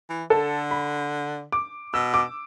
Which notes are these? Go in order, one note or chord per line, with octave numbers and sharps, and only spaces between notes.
E3
D3 A4
B5
D6
B2 E6
D6